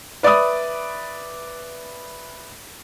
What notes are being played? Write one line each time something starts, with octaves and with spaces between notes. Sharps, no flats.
B4 D5 E5 B5 D#6